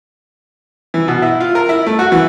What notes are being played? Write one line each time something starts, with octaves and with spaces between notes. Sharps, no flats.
E3
B2
E4
F4
A#4
E4
A3
F#4
E3